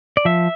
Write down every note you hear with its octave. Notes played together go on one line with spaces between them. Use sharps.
D5
F3 E5